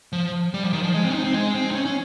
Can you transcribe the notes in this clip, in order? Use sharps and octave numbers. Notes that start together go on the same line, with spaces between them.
F3
G3
F3
D#3
F3
G#3
C4
C#4
D#4
C4
G#3
C4
D#4
C#4
C#4